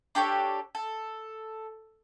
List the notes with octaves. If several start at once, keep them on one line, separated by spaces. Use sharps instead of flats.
D4 G4 A4 C#5
A4